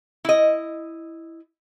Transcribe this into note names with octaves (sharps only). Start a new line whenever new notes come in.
E4 D#5